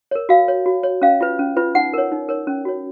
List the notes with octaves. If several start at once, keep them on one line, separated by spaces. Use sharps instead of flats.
A#4 C#5
F#4 F5
C#5
F#4
C#5
C#4 F5
F4 B4
C#4
F4 B4
D#4 F#5
A#4 C#5
D#4
A#4 C#5
C#4
F#4 C#5